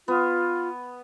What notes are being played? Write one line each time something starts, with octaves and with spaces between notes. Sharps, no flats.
B3 F4